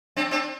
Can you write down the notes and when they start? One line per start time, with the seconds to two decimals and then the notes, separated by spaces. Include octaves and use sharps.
0.17 C4 D4
0.31 C4 D4